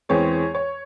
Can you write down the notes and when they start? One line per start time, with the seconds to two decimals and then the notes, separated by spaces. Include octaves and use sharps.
0.09 E2 E3 G#3 C4 C#5
0.54 C#5